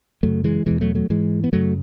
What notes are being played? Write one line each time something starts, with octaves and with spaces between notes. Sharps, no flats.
F#2 C#3 F#3 A3
E3 G#3
E2 B2 E3 G#3
F#3 A3
F#3 A3
G#2 E3 G#3
B3
F#2 C#3 F#3 A3